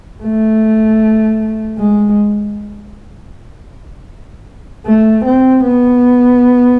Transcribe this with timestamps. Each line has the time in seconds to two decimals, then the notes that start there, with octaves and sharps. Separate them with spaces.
0.24 A3
1.78 G#3
4.87 A3
5.25 C4
5.64 B3